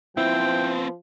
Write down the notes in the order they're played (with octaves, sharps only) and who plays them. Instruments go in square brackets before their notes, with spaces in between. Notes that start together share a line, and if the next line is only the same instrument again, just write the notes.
[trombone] F3 [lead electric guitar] B3 C4 [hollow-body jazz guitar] E4 [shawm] G5